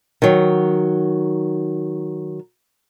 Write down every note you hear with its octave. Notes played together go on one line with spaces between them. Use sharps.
D#3 F#3